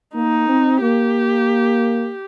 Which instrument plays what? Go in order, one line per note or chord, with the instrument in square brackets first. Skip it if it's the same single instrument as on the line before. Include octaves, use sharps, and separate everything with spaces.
[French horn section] A#3 [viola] D#4
[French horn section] C4
[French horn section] A#3 [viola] G4